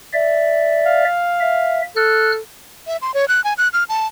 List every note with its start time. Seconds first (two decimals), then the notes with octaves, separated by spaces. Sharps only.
0.13 D5 E5
0.86 F5
1.40 E5
1.96 A4 F6 F#6
2.87 E5
3.02 C6
3.14 C#5
3.28 F#6
3.44 G#5
3.58 F#6
3.73 F6
3.89 A5